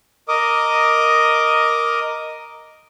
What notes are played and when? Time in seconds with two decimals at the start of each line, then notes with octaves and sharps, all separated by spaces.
0.28 A#4 D#5 D6 D#6